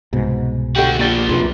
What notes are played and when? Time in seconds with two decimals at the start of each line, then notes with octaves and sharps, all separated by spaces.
0.13 C2 G#2 B2
0.76 D3 F#4 G4 A4 G5
0.99 A#2 F3 D4 D5
1.29 B1 F2 C3 F4 B4